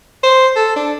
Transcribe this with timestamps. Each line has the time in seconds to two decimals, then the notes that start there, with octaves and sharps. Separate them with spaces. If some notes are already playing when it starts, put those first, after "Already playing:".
0.24 C5
0.56 A4
0.76 D4